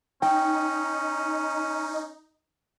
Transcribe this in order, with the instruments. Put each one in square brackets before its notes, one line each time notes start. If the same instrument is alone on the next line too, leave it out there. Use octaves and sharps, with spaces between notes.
[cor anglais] C#4 [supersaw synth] D#4 [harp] G5